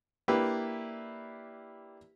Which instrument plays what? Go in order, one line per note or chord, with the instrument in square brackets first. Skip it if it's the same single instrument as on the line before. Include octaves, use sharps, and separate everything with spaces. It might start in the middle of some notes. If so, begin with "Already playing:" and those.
[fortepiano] A#3 D4 E4 G4 B4